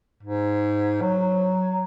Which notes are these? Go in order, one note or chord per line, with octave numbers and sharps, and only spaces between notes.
G#2
F#3